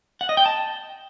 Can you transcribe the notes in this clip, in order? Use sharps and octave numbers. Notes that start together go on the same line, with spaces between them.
F#5
D#5
G5
A5